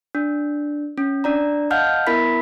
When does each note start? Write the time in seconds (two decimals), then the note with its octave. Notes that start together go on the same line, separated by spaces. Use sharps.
0.15 D4
0.98 C#4
1.24 D4 D5 A#5
1.70 D#5 F5 F#5 A5 F6 G6
2.07 B3 E4 A#4 E5 B5 B6